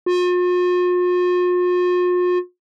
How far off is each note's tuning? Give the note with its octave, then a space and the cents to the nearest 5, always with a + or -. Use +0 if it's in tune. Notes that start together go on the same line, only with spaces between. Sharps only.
F4 +45